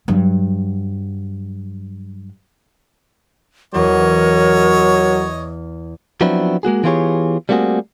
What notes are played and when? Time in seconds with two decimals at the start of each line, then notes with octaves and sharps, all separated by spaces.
0.08 G2 F#3
3.74 E2 F#3 A#4 C#5 D#5
6.21 F3 F#3 B3 C4 D4 E4
6.63 G#3 A#3 F#4 G#4
6.84 E3 B3 F4 G4 G#4 C#5
7.49 G3 A3 A#3 C4 F#4 G#4